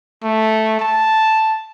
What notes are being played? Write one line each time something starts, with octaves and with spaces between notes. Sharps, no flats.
A3
A5